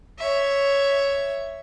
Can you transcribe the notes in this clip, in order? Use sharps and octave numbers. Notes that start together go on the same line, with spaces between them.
C#5 E5